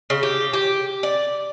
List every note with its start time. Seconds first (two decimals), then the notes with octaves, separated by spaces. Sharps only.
0.10 C#3
0.23 G4
0.53 G4
1.03 D5